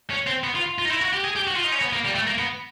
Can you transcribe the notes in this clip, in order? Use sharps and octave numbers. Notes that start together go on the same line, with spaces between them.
C#4
C4
B3
F4
F4
D#4
E4
F#4
G4
G#4
G4
F#4
F4
D#4
C#4
B3
A#3
G3
A3
A#3
B3